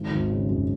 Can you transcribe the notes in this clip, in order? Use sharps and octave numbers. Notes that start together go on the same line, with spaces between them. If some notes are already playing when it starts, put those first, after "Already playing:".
Already playing: G#1
G#1
C#3
F#2